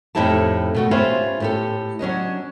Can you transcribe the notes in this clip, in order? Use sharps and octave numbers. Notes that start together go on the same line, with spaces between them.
F2 A2 D#4 E4 G4 A5
B2 A3 F#4
C#4 F4 G4 B4 C5 E5
A2 G4 A4
F#3 C#4 D4 D#5